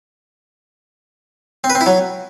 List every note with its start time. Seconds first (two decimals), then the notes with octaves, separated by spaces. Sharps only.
1.64 C4
1.70 B4
1.75 C4
1.81 E4
1.86 F#3